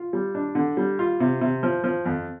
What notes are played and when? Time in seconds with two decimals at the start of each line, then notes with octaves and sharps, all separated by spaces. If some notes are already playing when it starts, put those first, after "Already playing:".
Already playing: F4
0.13 G3
0.35 D4
0.55 D3
0.77 G3
0.99 F4
1.20 C3
1.41 C3
1.63 F3
1.84 F3
2.05 F2